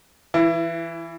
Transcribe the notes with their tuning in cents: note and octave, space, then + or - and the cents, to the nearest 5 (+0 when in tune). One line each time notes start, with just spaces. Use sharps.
E3 +0 E4 +30